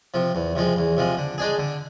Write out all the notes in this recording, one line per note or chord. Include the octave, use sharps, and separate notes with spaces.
C3 F3
E2
C3 F3 G#3
E2
C3 F3 G#3
D3
G#3 D4 G#4
D3